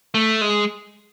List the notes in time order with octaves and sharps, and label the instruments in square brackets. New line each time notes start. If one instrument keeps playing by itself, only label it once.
[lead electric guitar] A3
G#3